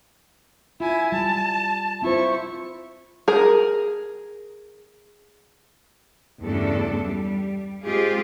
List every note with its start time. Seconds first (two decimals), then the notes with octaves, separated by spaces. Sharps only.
0.80 E4 F4 G#5
1.12 G3 A5
2.02 C4 E4 F4 C5 C#6
3.28 G#4 A#4
6.42 E2 G2 C#3 A3 D4 A4
7.03 G3
7.83 G#3 C4 F4 G4 G#4